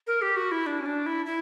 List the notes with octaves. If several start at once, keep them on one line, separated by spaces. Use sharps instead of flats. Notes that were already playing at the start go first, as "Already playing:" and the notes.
A#4
G4
F#4
E4
D4
C#4
D4
E4
E4